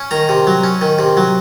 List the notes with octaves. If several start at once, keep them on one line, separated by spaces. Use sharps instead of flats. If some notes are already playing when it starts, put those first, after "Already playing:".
Already playing: C#4
D#3 A#5
C3
F#3
C#4
D#3
C3
F#3